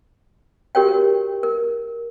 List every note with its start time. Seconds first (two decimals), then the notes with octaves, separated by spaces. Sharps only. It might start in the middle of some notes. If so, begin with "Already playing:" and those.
0.75 F#4 G4 A#4 C#5 G5
0.88 A#4
1.43 A#4